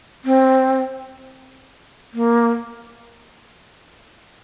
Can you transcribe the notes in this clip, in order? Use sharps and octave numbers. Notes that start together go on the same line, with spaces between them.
C4
A#3